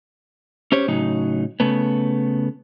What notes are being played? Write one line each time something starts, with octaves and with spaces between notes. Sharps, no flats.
C#4 G4 C5 C#5
A2 C#3 F#3 D#4
C#3 A3 B3